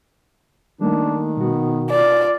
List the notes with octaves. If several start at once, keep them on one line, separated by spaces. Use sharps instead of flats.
D#3 G3 A3 A#3 D4
B2 B3 F#4
F4 D5